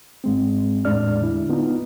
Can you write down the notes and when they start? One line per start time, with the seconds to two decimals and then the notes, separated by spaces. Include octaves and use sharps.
0.24 G#2 G#3 C4
0.85 E2 A2 G#3 D4 D5 F6
1.22 D3 E4
1.49 B3 D#4 F4